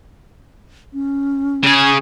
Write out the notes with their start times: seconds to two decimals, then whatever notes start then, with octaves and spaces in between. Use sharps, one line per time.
0.93 C#4
1.64 C#3 G#4